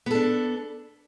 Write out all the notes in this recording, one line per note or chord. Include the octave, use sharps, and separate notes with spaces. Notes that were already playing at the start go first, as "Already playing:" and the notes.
B3 D4 A4